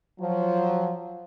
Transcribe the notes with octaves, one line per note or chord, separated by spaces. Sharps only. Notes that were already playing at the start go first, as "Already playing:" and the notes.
F3 F#3